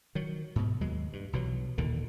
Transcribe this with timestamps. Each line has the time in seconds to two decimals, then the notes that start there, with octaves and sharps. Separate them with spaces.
0.15 D#3 F#3
0.56 G#2 B2
0.81 D#2 F#3 G#3
1.13 G2
1.33 B1 B2 E3 F#3
1.78 D#2 A#2 D3 D#3